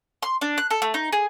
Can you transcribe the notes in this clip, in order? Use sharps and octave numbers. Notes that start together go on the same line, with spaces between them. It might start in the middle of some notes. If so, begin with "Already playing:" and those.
C6
D4
F#6
A4
A3
D#4
G#4